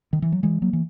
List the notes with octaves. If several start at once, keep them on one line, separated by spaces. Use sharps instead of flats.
D#3
E3
F#3
E3 G#3
F#3 A#3
E3